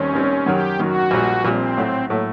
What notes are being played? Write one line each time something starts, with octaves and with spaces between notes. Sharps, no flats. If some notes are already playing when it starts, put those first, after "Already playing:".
Already playing: D#2 D#3 G3 C4 C#4
D#2 D#3 G3 C4
F#2 D#3 F#3 G4
F#2 D#3 F#3 F#4
A#1 A#2 G3
A#1 A#2 G3 C4
A2 F#3 A3
A2 F#3 A3